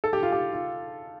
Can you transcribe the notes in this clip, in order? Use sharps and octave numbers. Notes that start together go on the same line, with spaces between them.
A4
G4
F4
G4
F4